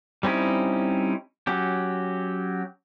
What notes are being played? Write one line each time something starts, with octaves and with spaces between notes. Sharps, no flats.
G3 C4 C#4 D#4 E4
F#3 C#4 G4